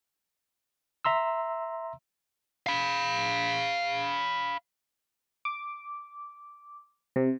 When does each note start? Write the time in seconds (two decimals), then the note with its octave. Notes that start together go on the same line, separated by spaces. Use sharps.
1.05 E5 A#5 C6 E6
2.66 F5 B5
5.45 D6
7.16 C3